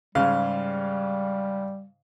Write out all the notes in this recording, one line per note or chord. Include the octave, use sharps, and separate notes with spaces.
G#2 C#3 G3 F5